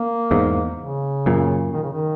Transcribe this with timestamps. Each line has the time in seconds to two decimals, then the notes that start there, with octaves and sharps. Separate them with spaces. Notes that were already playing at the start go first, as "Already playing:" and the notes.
Already playing: A#3
0.31 E2 G#2
0.79 C#3
1.26 F#2 A#2
1.73 D#3
1.83 C#3
1.93 D#3